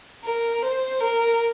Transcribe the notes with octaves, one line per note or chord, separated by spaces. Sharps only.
A#4
C5
A#4